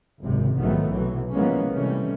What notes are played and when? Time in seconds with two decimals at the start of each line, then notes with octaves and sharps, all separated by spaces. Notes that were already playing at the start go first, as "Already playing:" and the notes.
0.23 G#1 C#2 F#2 C3
0.59 A#1 G#2 D#3 F#3 A3 B3
0.89 B1 C3 E3 F#3
1.33 E3 F3 G#3 A#3 B3 C#4
1.72 C3 D#3 E3 G3 A3 C#4